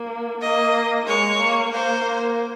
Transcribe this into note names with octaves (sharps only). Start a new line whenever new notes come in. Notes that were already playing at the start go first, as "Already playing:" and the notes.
Already playing: A#3
A#3 D#5
G#3 C#5
A#3
A#3 C5
A#3